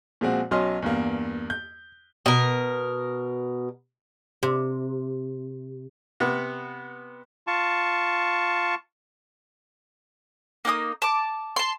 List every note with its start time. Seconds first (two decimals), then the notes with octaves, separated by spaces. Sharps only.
0.21 A#2 F3 G#3 C4 F#4
0.51 B1 F#3 C#4 D#5 C6 F6
0.82 E2 G2 A#3
1.50 G6
2.26 B2 A#4
4.43 C3
6.20 C3 B3
7.47 F4 A5 C#6
10.65 A#3 D#4 F#5 D#6
11.02 A5 D6
11.56 A5 C6